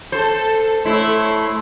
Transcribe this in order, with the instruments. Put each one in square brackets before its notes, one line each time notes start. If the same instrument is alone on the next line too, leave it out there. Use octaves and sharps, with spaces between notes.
[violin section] A4 [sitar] C5
[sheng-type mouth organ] A3 C6 [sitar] E4 [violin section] C#5